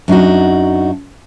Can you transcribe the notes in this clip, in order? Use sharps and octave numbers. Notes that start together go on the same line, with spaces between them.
F#2 D4 D#4 F#4